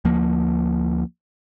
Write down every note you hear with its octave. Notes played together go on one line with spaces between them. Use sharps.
D2 F3 A#3